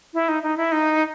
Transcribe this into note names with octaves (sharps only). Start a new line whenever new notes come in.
E4
D#4
D#4
E4
D#4